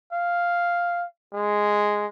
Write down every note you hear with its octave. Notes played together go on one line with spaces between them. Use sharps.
F5
G#3